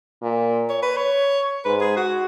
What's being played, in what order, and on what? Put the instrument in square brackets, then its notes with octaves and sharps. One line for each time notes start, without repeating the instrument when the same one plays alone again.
[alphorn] A#2
[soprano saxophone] C#5
B4
C#5
[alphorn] G#2 [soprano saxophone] B4
[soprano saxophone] G#4
F#4